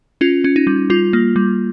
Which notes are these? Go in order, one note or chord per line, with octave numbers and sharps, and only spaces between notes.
C#4 F4
C#4
D#4
G3
G3 F4
A#3
G3